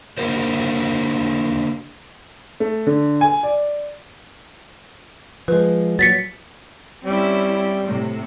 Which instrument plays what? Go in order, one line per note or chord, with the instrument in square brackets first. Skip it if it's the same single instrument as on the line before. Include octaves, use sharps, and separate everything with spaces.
[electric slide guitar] D3 A#3 F#4 A#4 C5
[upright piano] A3
D3
G#5
D5
[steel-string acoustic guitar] F3 G#3 [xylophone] B4
[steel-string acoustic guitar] A#2 F#3 [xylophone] A6 B6 C#7
[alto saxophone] G3 [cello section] C4 C#4 E4
[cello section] A2 C3